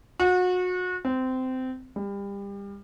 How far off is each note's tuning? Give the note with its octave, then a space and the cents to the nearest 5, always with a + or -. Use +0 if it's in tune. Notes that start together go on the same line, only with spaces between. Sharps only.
F#4 -30
C4 -20
G3 +30